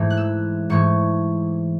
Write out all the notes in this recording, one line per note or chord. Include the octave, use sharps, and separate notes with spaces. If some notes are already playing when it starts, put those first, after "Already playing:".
Already playing: G#2 E3 A3
F#6
E6
G#2 E3 A3 C#6